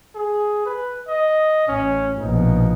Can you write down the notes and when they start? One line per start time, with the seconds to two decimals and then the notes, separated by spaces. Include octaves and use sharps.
0.15 G#4
0.66 B4
1.08 D#5
1.68 A1 C#4
2.19 A#1 B2 D#4